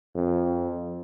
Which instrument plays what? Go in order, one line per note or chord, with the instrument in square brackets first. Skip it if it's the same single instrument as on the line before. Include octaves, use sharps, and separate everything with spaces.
[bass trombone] F2